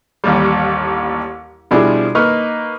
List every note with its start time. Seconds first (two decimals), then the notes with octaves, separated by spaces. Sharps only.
0.24 A1 D#2 G3
1.71 B2 F3 G3 D4 E4 G#4
2.15 A#3 D#4 B4 C#6 F6